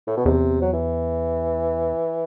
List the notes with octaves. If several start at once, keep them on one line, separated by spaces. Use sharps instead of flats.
A2
B2
E2 C3
F#3
E3